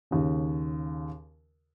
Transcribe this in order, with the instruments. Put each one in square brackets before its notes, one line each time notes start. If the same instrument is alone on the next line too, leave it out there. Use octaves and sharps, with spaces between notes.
[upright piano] D#2 C#3